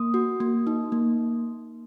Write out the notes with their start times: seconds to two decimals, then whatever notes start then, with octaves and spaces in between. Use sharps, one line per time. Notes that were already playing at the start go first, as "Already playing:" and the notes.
Already playing: A#3 D#6
0.14 F#4
0.40 A#3
0.67 D#4
0.92 A#3